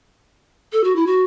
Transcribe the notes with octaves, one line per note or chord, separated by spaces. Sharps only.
A4
F#4
E4
F#4